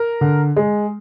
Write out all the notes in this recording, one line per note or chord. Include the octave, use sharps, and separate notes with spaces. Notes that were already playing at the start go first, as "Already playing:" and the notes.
Already playing: A#4
D3
G#3